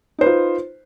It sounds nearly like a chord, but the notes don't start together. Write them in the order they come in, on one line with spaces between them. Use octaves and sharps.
D#4 C5 B4 F4